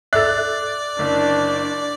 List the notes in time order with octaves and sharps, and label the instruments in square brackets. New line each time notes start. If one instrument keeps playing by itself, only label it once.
[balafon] A4 E5 [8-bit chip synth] D5 [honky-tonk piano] F#6 A6
[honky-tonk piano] F#1 [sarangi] D4